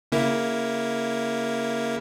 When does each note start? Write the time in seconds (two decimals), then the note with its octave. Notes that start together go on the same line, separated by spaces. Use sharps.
0.12 C#3 A#3 E4